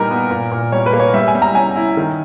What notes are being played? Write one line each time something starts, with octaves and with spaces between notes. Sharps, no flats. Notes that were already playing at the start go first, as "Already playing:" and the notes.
Already playing: A#2 G3 B3 D#4 A#4
B3
A#2
A#2
G3 C#5
B4
A#3
C#5
G3 E5
G#5
G3
A#5
C#4 G#5
E4
D#3